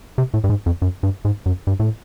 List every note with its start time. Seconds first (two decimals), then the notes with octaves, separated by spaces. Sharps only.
0.18 C3
0.34 A2
0.44 G2
0.50 G#2
0.66 F2
0.82 F#2
1.03 G2
1.25 G#2
1.46 F#2
1.67 G2
1.80 A2